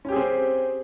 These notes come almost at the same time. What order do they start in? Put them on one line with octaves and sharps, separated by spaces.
C#4 G4 G#4 C4